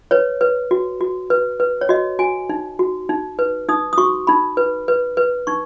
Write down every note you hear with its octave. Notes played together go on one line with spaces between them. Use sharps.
B4 C#5
B4
F#4
F#4
B4
B4
C#5
F#4 D#5
F#4 G#5
D#4
F#4
D#4
B4
D#4 D#6
D#6
F#4 C#6
D#4 B5
B4
B4
B4
D#4 C#6